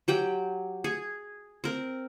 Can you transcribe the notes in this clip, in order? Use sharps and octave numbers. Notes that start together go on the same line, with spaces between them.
F#3 G4 G5
G#4
C4 A#4